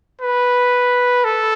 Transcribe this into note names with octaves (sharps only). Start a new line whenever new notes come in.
B4
A4